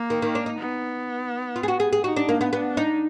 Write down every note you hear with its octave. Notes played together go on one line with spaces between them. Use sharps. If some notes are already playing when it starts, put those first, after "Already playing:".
Already playing: A#3
D#3
D#3
D4
D#4
B3
F4
G#4
F#4
G#4
G#4
D#4 F#4
D4
A#3
B3
B3 D4
D#4